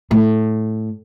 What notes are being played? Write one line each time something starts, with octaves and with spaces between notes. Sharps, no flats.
A2